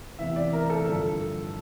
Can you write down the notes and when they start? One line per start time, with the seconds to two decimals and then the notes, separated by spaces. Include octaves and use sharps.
0.19 E2 C3 E3 E5
0.36 D5
0.53 A#4
0.70 A4
0.86 G2 D3 F3 A4